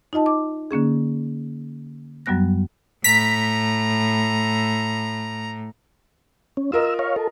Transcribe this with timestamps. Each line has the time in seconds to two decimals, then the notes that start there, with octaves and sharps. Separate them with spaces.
0.13 D#4 F4 D#5 A5
0.26 D6
0.71 D3 A#3 C#4 G#4
2.26 F#2 F#3 G3 B3 F#6 A#6
3.04 A2 A#5 B6
6.57 C#4
6.72 F4 A#4 D#5 E6
6.99 C#5 F5
7.16 A4